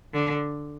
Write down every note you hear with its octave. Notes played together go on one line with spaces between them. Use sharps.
D3